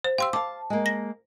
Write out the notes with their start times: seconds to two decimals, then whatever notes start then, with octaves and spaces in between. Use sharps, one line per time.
0.04 C5
0.18 G4 F5 C6 E6
0.33 F5 A5 D6
0.70 G#3 A#3
0.86 A#6